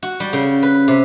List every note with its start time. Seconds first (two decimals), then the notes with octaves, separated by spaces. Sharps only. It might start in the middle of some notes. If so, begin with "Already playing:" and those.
0.03 F#4
0.20 G3
0.33 C#3
0.63 B4
0.88 C3